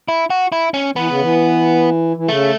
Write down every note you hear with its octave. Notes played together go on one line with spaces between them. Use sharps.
E4
F#4
E4
C#4
E3 B3
C#3
E3
E3
C#3 A3